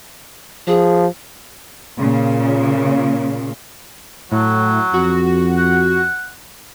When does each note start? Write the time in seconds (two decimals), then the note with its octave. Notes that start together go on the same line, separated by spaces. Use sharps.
0.68 F3 G#4
1.99 A#2 C#3
4.32 A2 F#3
4.94 F2 F#4
5.57 F#5